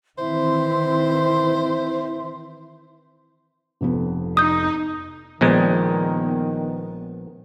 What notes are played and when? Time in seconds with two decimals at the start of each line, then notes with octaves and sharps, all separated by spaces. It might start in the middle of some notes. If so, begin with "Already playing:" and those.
0.18 D#3 E3 C4 E4 C5 E5 C6
3.81 F1 F2 B3
4.37 D#4 D#6 G6
5.41 A#1 A#2 D#3 G#3 B3 B4